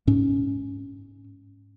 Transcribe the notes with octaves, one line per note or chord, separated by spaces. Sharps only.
G#2 C#4